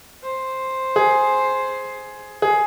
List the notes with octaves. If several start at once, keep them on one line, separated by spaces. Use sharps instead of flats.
C5
G#4
G#4